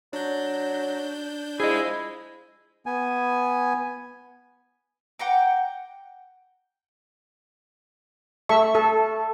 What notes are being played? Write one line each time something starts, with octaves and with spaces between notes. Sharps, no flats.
F#3 D4 G6
F3 E4 G#4 D#5
B3 G#5
F#5 G5 A#5 D6
A3 E5 C#6
A4